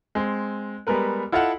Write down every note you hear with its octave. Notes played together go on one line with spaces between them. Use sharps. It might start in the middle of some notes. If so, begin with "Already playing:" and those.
G#3 C4
G3 G#3 B3 A#4 B4
E4 F4 A4 D#5 F5 F#5